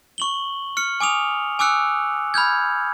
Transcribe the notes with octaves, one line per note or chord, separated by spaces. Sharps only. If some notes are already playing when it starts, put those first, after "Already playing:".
C#6 F#7 G7
F6 C#7
G#5 D6 D#6 F7
G#5 D6 E6 F#6 C#7
B5 F6 G6 G#6